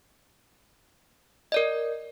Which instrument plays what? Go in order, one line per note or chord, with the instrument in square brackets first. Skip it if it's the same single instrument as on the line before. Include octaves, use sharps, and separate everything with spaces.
[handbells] A#4 D5 D#5